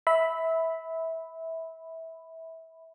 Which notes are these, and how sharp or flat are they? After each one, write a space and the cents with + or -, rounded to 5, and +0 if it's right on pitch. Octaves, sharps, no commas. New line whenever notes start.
E5 -20 B5 +5